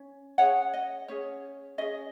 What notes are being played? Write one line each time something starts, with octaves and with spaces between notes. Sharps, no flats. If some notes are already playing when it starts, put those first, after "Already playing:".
Already playing: C#4
C#4 G#4 C#5 F#5
D#5
C#4 G#4 C#5
C#4 G#4 D#5